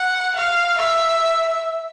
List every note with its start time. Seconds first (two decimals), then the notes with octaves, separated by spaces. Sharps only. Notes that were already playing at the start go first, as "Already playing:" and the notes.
Already playing: F#5
0.36 F5
0.79 E5